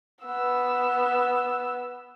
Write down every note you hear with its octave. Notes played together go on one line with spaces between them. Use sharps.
B3 E6